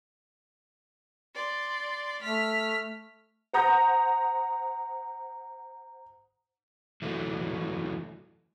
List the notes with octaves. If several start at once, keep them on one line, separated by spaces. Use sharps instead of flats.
D5 C6
A3 F6 B6
C5 F#5 A#5 D#6 G6 A#6
E3 F#3 A3